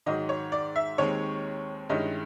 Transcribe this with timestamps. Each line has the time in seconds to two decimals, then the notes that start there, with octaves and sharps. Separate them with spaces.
0.06 G#2 D#3 F#3 D#5
0.29 C#5
0.52 D5
0.76 E5
0.98 D#2 D#3 G#3 C4 C#5
1.89 G2 D#3 G#3 C#4 E4 D#5